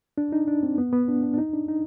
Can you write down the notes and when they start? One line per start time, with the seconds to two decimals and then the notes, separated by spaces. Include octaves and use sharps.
0.18 D4
0.32 D#4
0.48 D4
0.63 C4
0.78 B3
0.93 B3
1.08 D4
1.23 D4
1.34 D4
1.38 D#4
1.53 D4
1.68 D#4